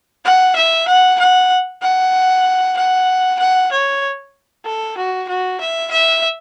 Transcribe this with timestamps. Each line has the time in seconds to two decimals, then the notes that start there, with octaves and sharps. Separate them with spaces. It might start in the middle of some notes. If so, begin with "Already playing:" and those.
0.25 F#5
0.56 E5
0.88 F#5
1.20 F#5
1.82 F#5
2.77 F#5
3.39 F#5
3.72 C#5
4.66 A4
4.98 F#4
5.29 F#4
5.61 E5
5.91 E5